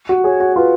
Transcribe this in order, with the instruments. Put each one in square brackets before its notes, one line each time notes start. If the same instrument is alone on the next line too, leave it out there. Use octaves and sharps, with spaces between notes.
[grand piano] F#4
[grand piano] G#4 [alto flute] C#5
[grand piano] F#4
[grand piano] F4 [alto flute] B4